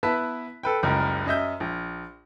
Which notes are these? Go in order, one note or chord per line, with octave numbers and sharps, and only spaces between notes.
B3 E4 B4 A5 B6
A4 B4 G5
F#1 C#2 F#2 G3 A#4
F#2 D#5 E5 G6
A#1